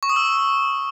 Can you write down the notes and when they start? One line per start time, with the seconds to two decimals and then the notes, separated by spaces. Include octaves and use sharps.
0.03 C#6
0.09 D#6
0.16 E6